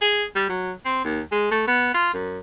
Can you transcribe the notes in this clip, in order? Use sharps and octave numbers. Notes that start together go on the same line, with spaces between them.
G#4
G3
F#3
C4
D#2
G#3
A3
B3
F4
F#2